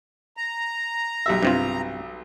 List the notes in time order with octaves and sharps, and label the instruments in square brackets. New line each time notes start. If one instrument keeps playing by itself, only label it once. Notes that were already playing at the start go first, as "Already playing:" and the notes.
[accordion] A#5
[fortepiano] B1 G3 E5
[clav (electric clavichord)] G2 C3 F4